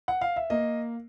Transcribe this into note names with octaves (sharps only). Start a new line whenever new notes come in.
F#5
F5
E5
A#3 D#5